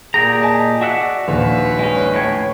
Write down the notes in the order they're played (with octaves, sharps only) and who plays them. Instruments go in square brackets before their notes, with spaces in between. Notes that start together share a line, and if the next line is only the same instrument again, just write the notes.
[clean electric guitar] A#2 G4 A#5 [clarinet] G#4
[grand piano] D#5 G#5 A5
[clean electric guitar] F#4 E5 F#5 [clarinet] D5
[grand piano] A#1 D#2 [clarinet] B4
[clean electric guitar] G#3 C#4
A2 C#5